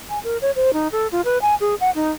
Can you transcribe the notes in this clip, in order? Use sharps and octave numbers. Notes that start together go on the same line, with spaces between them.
G#5
A#4
C#5
C5
D#4
A4
F4
B4
G#5
G#4
F#5
D#4